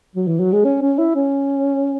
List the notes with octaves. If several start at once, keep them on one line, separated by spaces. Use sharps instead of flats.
F#3
E3
F#3
G#3
C#4
C#4
E4
C#4